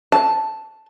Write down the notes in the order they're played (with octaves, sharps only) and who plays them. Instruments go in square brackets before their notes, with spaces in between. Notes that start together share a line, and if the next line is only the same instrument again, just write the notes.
[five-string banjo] A5